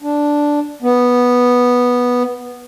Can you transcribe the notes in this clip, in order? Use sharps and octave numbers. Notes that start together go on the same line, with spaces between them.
D4
B3